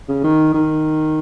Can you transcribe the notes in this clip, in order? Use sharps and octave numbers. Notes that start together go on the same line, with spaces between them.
C#3
D#3
D#3